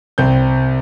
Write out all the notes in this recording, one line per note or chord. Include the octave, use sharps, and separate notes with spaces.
C2 C4 G6